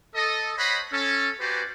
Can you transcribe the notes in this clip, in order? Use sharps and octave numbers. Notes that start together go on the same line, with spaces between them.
A4 D#5
C5 C#5 D#5 F#5 B5
C#4 A4
F#4 G4 B4 C5 D5 G#5